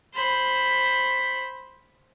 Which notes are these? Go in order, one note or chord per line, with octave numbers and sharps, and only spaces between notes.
C5 B5